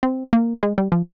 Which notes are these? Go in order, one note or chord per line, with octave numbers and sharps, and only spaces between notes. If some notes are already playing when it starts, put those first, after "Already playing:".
C4
A#3
G#3
G3
F3